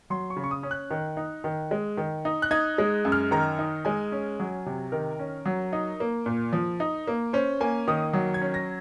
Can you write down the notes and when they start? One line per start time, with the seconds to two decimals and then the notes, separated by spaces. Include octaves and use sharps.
0.10 F#3 C6
0.30 C#6
0.37 C#3
0.44 C#6
0.51 D#6
0.63 C#4
0.71 F#6
0.91 D#3
1.17 D#4
1.44 D#3
1.71 G#3
1.97 D#3
2.25 D#4
2.42 F#6
2.51 D#4 G#6
2.78 G#3
3.05 F#2
3.12 F6
3.31 D#3 A#5
3.59 D#4
3.85 G#3 G#5
4.12 C#4
4.39 F#3
4.66 C3
4.92 D#3 A#4
5.19 C#4
5.46 F#3
5.73 D#4
6.00 A#3
6.26 A#2
6.53 F3
6.80 D#4
7.07 A#3
7.33 C#4 C5
7.61 A#3 G#5
7.88 D#3 D#6
8.13 F#3
8.34 G#6
8.41 C#4
8.54 A#6